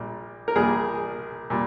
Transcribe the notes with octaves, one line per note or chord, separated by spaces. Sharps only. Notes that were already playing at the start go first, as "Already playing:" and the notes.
Already playing: A#1 A#2 G3
A#4
A#1 A#2 G3 A#3 G#4
A#2 G3